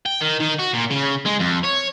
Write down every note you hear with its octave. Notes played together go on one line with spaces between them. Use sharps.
G5
D#3
D#3
F#4
A#2
C#3
G#3
F2
C#5